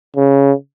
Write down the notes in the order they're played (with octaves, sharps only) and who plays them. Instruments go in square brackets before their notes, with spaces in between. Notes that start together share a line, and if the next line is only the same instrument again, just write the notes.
[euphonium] C#3